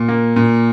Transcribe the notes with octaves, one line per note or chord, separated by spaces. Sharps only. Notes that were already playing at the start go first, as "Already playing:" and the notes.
Already playing: A#2
A#3
A#2